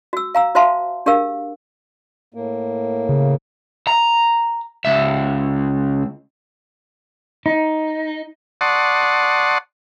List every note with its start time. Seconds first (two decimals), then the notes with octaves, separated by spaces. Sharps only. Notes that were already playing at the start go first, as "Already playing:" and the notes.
0.13 F#4 E6
0.35 F5 A#5 E6
0.55 F#4 C5 E5 F5 A5 C6
1.06 D4 G4 G#4 A#4 F5 E6
2.34 A2 A#3
3.09 C#3
3.87 A#5
4.85 C#2 E5
7.46 D#4
8.61 D5 F#5 A5 C6 C#6 D#6